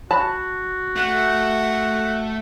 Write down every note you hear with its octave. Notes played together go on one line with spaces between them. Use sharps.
F#4 A5 B5
A3 F#5